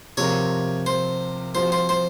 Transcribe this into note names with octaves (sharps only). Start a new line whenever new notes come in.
C3 F3 C4 F4 A#4 C#5
C5
F3 C4 F#4 C5
C5
C5